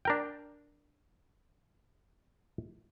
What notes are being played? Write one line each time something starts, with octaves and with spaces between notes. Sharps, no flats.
D4 A#4 G5